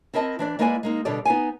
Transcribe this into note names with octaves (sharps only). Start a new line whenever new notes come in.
C4 E4 A#4 D#5 A5
E3 D4 D5
G#3 A#3 E4 B4 D5 G#5
G#3 A#3 D#4
B2 D3 G3 A4 D5
B3 D#4 F5 G#5